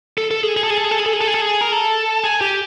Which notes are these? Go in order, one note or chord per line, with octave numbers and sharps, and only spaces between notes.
A4
A4
G#4
G#4
A4
G#4
A4
G#4
A4
G#4
A4
G#4
A4
G#4
A4
G#4
A#4
A4
G#4
G4